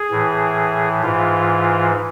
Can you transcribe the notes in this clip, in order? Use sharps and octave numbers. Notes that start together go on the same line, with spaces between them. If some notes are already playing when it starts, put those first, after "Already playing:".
Already playing: G#4
A2 E3
G#2 E3 F4